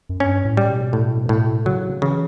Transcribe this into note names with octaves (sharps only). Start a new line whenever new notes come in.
F#2
G2 C#4
A2
G3
B2
A2
A2
C#3 F#3
C#3 E3